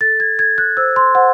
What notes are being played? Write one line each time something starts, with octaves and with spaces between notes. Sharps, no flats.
A4 A6
G#6
A4 G#6
F#6
C5 E6
C6
C5 F#5